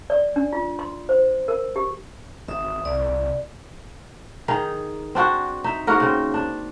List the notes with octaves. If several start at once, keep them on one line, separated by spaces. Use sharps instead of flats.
D5
D4
F4
C6
C5
A#4
G4
G#1 E5 D#6
C2 D5
D#3 D#4 G#4
C4 D4 F#4
D#4 E5
G#2 A#3 F#4 A#4
C#3 C4
D4